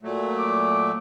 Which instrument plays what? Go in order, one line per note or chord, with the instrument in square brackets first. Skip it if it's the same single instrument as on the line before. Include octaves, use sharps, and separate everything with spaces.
[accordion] A#2 F#3 A3
[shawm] D6